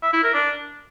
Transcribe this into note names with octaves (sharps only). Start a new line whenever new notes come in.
E5
E4
A#4
D4